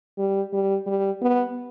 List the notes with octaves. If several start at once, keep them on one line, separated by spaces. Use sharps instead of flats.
G3
G3
G3
B3